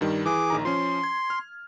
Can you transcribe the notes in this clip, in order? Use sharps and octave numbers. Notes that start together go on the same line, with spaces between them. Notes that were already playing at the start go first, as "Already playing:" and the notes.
G2 D#3 G3
E3 G#4 D6
A#1 D#3 A#5
F3 C#4 C6
G#6
F6